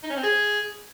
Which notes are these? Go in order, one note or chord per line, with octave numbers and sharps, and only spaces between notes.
D#4
C#4
C4
G#4